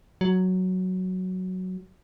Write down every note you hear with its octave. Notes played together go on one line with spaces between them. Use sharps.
F#3